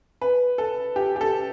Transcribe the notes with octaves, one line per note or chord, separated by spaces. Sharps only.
B4
A4
G4
G4
A4